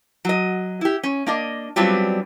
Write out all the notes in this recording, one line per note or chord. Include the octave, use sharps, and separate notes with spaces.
F#3 D#5
E4 G4
C#4
A#3 D4 D#5
F#3 G3 B3 C4 D4 F4